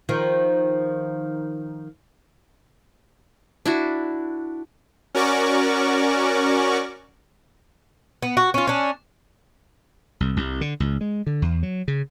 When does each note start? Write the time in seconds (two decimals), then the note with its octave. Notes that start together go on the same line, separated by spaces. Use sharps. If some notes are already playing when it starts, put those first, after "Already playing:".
0.09 D#3 F3
3.66 D4 E4 F#4
5.15 C#4 F#4 A#4 D5 C#6 D6
8.22 B3
8.37 F#4
8.54 C#4 F4
8.67 C#4 D4
10.20 C2
10.36 C2
10.61 D3
10.80 C#2
11.01 G#3
11.27 D3
11.42 E2
11.63 F#3
11.88 C#3